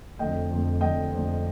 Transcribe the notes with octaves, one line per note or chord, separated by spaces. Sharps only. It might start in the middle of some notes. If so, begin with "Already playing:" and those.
F2 D3 A3 D#5 G5
F2 D3 A3
F2 D3 A3 D#5 G5
F2 D3 A3